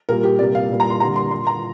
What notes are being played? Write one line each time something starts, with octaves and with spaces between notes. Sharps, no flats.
A#2 G3 A#3 A#4
G4
C3 G3 A#3 D5
F5
A#2 G3 A#3
A#5
C6
D3 G3 A#3 A#5
C6
A#2 A#3 C6
A#5